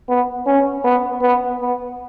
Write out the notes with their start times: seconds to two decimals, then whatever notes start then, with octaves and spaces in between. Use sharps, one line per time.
0.09 B3
0.47 C#4
0.84 B3
1.22 B3
1.61 B3